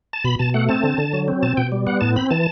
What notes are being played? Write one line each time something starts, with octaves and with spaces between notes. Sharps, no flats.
A5
B2 B5
B2 A5
A3 F#5
C4 A5
D3
D3
F#3
C4
B2 A5
B2 G5
G3
B3 F#5
A2 A5
C4 B5
E3 A5